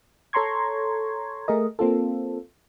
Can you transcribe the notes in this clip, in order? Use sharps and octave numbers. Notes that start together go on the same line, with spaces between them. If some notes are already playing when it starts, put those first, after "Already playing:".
A4 C#5 A#5 C6 C#6 G#6
A3 G#4 A#4 D#5
A#3 C4 F4 A4